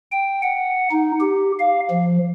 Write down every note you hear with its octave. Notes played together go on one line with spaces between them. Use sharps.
G5
F#5
D#4
G4
F5
F3